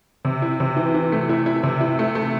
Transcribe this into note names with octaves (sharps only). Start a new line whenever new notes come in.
C3
E4
C3
E3
E3
A3
E4
E4
C3
E4
A3
A3